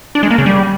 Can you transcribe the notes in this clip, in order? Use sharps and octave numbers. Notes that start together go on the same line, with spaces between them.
D4
G#3
A#3
C#3
G3